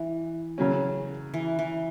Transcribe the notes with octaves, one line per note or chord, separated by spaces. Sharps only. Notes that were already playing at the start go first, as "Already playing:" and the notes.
Already playing: E3
C#3 F#3 C#4
E3
E3